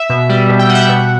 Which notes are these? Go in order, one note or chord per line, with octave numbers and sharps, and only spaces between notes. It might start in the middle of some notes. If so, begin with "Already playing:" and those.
Already playing: E5
B2
G3
B2
G5
G3 F#5
E5
F#5
B2